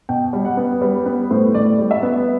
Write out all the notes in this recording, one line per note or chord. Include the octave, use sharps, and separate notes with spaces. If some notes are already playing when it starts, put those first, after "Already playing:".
B2 G5
G3
F#5
B3
G3 B4
B3 B4
A2 C5
A2 D5
G3
E5
B3